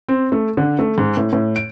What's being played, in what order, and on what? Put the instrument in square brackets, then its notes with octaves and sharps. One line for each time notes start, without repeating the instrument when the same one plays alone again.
[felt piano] C4
A3
D3
A3
G#2
A2
A2
D7